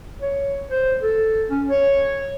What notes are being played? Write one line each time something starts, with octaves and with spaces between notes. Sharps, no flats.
C#5
C5
A4
C#4
C#5